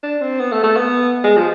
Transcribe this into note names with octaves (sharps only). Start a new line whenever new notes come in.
D4
C4
B3
A3
A3
B3
G#3
F3